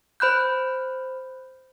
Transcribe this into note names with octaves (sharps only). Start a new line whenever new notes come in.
C5 B5 F#6 G6